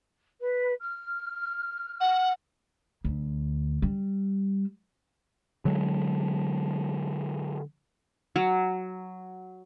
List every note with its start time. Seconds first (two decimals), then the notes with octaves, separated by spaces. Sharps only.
0.40 B4
0.80 F6
2.01 F#5
3.04 D2
3.82 G3
5.65 D3 F#3 G#3
8.36 F#3